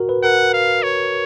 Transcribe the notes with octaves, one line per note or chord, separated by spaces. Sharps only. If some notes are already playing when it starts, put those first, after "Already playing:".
Already playing: F#4 A#4
B4
A#4 F#5
F5
C#5